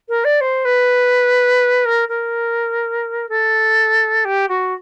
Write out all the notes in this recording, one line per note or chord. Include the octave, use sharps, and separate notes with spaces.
A#4
D5
C5
B4
A#4
A#4
A4
G4
F#4